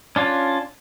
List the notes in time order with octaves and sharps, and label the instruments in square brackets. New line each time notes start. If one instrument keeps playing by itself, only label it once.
[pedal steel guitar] C#4 D4 F4